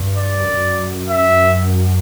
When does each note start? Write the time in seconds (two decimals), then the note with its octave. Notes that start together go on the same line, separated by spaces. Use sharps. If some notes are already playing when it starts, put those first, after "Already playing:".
Already playing: G2
0.17 D5
0.48 F#2
1.09 E5